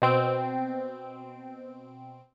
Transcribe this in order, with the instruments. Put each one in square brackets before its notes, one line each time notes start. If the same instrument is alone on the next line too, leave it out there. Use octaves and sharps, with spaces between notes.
[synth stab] B2 C4 D7